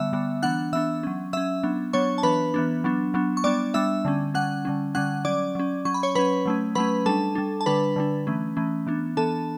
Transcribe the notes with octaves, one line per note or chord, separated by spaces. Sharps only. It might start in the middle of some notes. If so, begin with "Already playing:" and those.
Already playing: D3 G3 B3 E5 E6
D3 G3 B3
E3 B3 D4 F#5 F#6
E3 B3 D4 E5 E6
F#3 C#4
F#3 C#4 E5 E6
F#3 B3 D4
F#3 B3 D4 C#5 C#6
A5
E3 B3 D4 B4 B5
E3 B3 D4
F#3 B3 D4
F#3 B3 D4
C#6
G3 B3 D4 D5 D6
G3 B3 D4 E5 E6
D3 G3 C#4
D3 G3 C#4 F#5 F#6
D3 G3 C#4
D3 G3 C#4 F#5 F#6
F#3 C#4 D5 D6
F#3 C#4
F#3 C#4 C#6
B5
C#5 C#6
F#3 C#4 B4 B5
F#3 A3 C#4
F#3 A3 C#4 B4 B5
G3 D4 A4 A5
G3 D4
A5
D3 G3 D4 B4 B5
D3 G3 D4
E3 A3 C#4
E3 A3 C#4
E3 B3 D4
E3 B3 D4 A4 A5